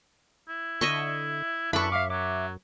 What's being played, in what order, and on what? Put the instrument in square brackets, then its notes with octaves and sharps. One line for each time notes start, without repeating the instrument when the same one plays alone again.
[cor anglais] E4
[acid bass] D3 [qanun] D#5 E5 C#6
[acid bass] F#2 [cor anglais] D4 [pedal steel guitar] E4 A4 B4 [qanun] B5 C#6
[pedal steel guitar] E5 D6 [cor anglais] F5
[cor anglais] F#3 [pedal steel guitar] E5 D6